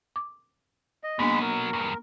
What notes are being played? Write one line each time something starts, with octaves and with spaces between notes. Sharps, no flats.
D6
D#5
B2 F#3 G#3 A#3 B3 D4 B5
A#4
E2 G2 C#6